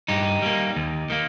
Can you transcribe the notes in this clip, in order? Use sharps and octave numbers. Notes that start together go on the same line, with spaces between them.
G2 D#4 G4
G3 A#3
D#2
D#3 A#3